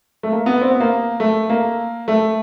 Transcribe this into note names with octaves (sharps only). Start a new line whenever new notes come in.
A3
A#3
B3
C4
B3
A#3
A3
A#3
A3